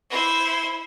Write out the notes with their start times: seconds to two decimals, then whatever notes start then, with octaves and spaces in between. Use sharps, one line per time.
0.10 E4 C5